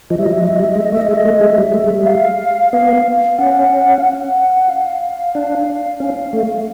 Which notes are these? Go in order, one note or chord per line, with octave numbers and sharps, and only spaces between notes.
F3 D#5
G3 E5
F#3 D#5
E5
D#5
F#3
E5
D#5
G3
E5
D#5
G#3
E5
D#5
A3 E5
D#5
G#3 E5
D#5
A3
G#3 E5
G3
A3
G#3
G3
F5
B3 F5
C#4 F#5
F5
F#5
F5
D4
C#4
A3